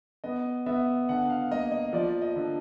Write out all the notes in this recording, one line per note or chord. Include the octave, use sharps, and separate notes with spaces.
B3 D#5
B3 E5
D3 F#5
F5
A#3 D#5
D#5
F3 D5
D#5
D3